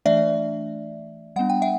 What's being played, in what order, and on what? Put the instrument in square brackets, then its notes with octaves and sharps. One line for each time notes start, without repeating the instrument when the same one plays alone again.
[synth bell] E3 A3 D4 D5 E5
G3 B3 D4 F#5
G5
E5 F#5